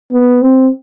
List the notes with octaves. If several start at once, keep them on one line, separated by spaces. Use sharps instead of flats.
B3
C4